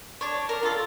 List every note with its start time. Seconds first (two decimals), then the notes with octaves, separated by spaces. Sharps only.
0.21 D4 C#5
0.49 A#4
0.63 F4 A4